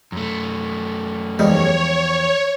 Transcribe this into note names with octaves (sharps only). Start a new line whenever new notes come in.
F#2 A3
E2 F3 G3 G#3 D#4 G4 C#5